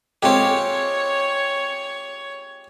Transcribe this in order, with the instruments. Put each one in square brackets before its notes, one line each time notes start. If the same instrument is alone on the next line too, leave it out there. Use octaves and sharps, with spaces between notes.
[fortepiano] G#3 C4 A4 [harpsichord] F4 G4 [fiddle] C#5